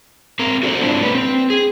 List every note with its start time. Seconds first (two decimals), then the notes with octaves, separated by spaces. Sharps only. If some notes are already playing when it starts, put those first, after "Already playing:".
0.39 C4 A#4
0.63 F#4 A4 C5 D5
0.81 G#3 C4 D4 E4 F4
1.02 A#3 C#4 B4
1.15 C4
1.50 G#4